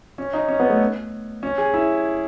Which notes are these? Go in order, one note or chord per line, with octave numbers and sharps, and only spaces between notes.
C#4
D#4
C#4
B3
A3
C#4
G#4
E4